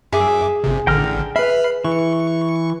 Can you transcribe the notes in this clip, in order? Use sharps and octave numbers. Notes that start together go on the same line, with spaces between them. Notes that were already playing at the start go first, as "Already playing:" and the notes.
F#2 G#4 E5 D6
G1 C3
A1 D3 G5 A#5 F6
B4 E5 B5 F6 C7
E3 C#6